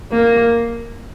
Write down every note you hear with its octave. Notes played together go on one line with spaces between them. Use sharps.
A#3